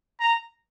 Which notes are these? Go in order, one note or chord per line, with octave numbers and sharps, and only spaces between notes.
A#5